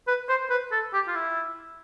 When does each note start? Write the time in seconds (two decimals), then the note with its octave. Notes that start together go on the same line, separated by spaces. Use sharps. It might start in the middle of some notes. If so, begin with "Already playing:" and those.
0.08 B4
0.29 C5
0.50 B4
0.72 A4
0.94 G4
1.08 F4
1.15 E4